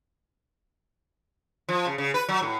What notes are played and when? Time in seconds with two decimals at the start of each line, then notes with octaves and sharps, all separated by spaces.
1.69 F3
1.87 C#3
1.98 C#3
2.14 B4
2.29 F#3
2.43 A2